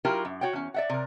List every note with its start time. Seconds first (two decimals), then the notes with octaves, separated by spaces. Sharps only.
0.05 F#3 E4 F4 G4 A#4
0.25 F#2
0.41 F#4 C#5 F#5 G5
0.53 E2 C#4
0.74 D5 E5 F#5
0.90 C3 A#4